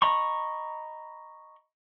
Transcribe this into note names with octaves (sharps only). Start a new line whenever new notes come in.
D#5 A#5 B5 C#6